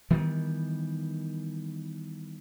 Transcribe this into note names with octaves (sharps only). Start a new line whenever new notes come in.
D#3 E3 G3 B3